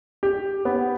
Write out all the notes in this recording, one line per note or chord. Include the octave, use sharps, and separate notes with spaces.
G4
B3